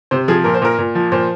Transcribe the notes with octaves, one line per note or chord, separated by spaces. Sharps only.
C3 C5
F3 G#4
A#2 A#4
C5
A#2 A#4
A#2
F3
A#2 C5